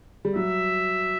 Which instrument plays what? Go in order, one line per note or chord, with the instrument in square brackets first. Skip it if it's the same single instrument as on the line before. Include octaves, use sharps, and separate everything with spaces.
[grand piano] G3
[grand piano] F#3 [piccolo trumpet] E5